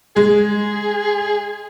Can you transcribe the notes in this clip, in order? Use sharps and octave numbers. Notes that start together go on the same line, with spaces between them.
G#3 G#4